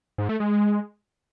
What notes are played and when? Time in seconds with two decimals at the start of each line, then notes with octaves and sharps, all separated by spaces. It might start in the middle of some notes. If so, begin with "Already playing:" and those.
0.18 G#2
0.29 A3
0.40 G#3